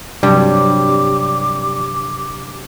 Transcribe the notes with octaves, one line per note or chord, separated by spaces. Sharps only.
G2 C3 F#3 G3 D6